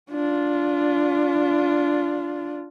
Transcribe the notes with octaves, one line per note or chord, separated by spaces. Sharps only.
D4 F4